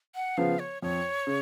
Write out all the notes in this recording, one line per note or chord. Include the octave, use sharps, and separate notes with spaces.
F#5
C#3 F3 B3 F5
C#5
F2 C#5
C#3